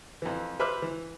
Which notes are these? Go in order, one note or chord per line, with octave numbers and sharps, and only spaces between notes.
F2 E3
B4 C5 E5 B5 D6 F6
E3